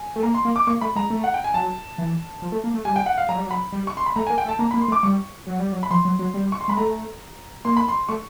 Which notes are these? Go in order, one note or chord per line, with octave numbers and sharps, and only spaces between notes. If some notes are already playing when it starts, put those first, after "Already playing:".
Already playing: G#5
A3
A#3 A#5
C6
A#3
D6
A#3 C#6
A3 B5
G#3 A#5
A3
F#5
G5
G#5
F#3 A5
E3
F3
A3
A#3
A3
G3 G#5
G5
F#5
F5
F#3 A#5
G3
F#3
B5
G3
C#6
C6
B5
A3 A#5
A#3 G#5
G5
A3
A5
A#3 A#5
A#3 B5
C6
A3
D6
G3 C#6
F#3
G3
F#3
B5
F3 C6
F#3
F#3
G3
C#6
C6
G#3 B5
A3 A#5
A#3 C6
B5
C6
A3 C#6